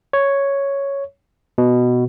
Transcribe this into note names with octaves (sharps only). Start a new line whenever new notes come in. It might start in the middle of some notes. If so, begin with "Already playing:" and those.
C#5
B2